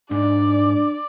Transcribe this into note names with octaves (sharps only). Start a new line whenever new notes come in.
G#2 D4 D5